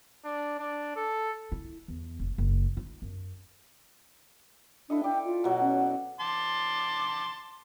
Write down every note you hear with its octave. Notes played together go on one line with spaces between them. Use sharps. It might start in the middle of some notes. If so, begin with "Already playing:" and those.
D4
D4
A4
E4
E2
F1
F#1
D#4
F#2
D4 E4 A4 D#5
D5 G5
F4
B2 F#3
C#4
A5 C6 D6